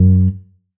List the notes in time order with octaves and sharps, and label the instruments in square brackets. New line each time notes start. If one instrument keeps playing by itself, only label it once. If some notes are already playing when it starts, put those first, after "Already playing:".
Already playing: [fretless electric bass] F#2